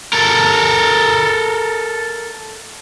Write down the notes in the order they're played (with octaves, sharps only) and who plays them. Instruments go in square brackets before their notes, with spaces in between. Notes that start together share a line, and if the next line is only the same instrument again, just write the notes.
[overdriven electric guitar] A4 A#4